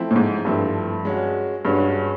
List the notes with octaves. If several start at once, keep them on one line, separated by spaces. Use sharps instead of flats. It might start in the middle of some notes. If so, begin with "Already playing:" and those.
Already playing: F3 A3 C4 E4
A2
G#2
G2 F3 A3 C4 E4
G#3 C#4 F#4
G2 G#3 C#4 F#4